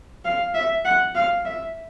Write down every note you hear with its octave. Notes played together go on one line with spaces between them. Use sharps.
F5
E5
F#5
F5
E5